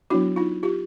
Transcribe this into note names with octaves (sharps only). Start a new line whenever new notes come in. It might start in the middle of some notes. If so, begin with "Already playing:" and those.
F#3 B3 D4 E4 F#4
D#4 F4
F4 G4